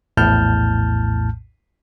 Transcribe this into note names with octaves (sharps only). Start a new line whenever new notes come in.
A#1 E2 A2 A5 F6 G6